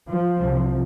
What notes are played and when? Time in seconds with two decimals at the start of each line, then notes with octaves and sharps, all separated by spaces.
0.10 F3
0.39 C2 C3